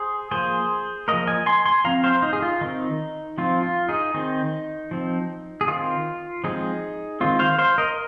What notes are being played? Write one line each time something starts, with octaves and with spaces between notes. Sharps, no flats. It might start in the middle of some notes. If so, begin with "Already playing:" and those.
Already playing: G#4 C5
F3 A#3 G#4 C5
F3 A#3 A#4 D#5
D#5 G#5
G#5 C6
G#5 C6
F3 C4 F5 A#5
C5 F5
D#4
G#4
F4
D#3 C4 D#4
F3 C4 F4
F4
D#4 G#4
D#3 C4 D#4
F3 C4
G#4
D#3 C4 F4
F3 G#3 C4 D#4 G#4
D#3 G#3 C4 F4
C5 F5
C5 F5
A#4 D#5